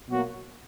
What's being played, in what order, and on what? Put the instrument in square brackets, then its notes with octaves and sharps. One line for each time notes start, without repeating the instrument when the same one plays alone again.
[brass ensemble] B2 F#3 A#3 F#4